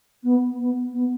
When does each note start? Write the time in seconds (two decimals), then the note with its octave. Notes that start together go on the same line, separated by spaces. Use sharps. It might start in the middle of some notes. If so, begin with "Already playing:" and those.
0.23 B3
0.59 B3
0.93 B3